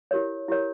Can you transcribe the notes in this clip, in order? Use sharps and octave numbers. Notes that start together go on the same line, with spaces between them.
E4 G4 A#4 C#5
E4 G4 A#4 C#5